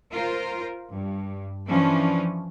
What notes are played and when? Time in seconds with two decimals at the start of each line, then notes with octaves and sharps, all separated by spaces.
0.12 F4 A#4 C5
0.92 G2
1.68 E3 F3 C#4 D4